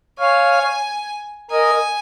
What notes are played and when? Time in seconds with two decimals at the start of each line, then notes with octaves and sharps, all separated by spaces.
0.19 C#5 F5 G#5
1.51 A#4 D#5 G#5